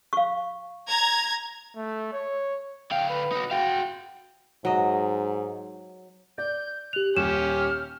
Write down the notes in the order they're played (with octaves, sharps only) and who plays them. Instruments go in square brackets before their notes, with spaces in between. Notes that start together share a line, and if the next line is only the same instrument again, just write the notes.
[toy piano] F5 C#6
[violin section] A#5 G#6
[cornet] A3
C#5
[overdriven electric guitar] D3 F5 [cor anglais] G5
[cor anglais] B4
[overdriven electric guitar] D#4 F#4
[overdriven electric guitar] F#4 F5 [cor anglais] G5
[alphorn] G#2 [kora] F#3 D#5
[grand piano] D5 [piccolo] G6
[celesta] G4 F7 [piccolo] F#6
[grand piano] D#1 [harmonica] C#4 G4 [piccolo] F6 [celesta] E7